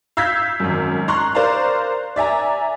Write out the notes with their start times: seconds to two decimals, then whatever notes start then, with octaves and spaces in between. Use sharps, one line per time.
0.17 F5 E6 G6 G#6 B6
0.60 G#1 F#2
1.08 A#5 C6 C#6 F#6
1.35 A#4 C5 D5 F5 A#5
2.16 D5 E5 G#5 A#5